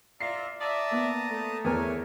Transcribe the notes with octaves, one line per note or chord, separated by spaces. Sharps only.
F4 D5 E5 A#5 C7
D5 E5 A5 A#5 D#6
A#3 B3
A3
E2 A#4 C#5 G#5